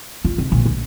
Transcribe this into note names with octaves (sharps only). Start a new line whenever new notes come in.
F4
F1
A#1
D2